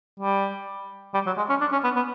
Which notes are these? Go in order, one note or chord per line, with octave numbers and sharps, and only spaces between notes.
G3
G3
F#3
G#3
C#4
D4
C#4
B3
B3